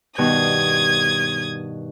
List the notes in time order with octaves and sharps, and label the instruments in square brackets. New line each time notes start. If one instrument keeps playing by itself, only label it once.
[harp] G2 B2 D#3 [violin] D#6 G#6